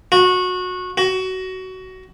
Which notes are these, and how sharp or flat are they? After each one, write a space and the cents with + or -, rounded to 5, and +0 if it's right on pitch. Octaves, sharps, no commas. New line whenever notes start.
F#4 -20
F#4 +20